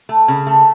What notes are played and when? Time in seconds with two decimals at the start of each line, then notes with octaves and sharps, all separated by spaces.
0.09 A3
0.28 C#3
0.47 A3